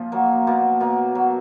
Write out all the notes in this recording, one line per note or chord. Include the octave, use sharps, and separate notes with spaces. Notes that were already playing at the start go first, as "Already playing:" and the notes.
Already playing: A#2 F3
F#3 A#3
B2 A#3
B2 A#3
F#3